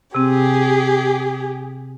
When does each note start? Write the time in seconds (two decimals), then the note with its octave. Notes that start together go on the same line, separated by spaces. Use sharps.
0.14 C3 C4 G4 G#4